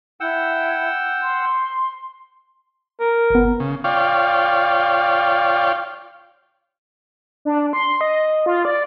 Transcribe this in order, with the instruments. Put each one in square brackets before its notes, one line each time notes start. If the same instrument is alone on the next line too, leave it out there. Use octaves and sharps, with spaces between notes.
[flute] E4 [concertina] F#5 G5 E6
[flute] C6
[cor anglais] A#4
[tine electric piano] G1 B3
[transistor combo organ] C#3
F4 C#5 D5 F5 G5
[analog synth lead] D4
C6
D#5
F4
D5